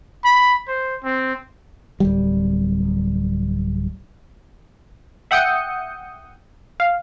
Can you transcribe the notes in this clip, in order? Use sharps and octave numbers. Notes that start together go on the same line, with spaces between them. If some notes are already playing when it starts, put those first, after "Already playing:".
B5
C5
C4
D1 G3
E5 F#5 G5 D#6 G6 C#7
F5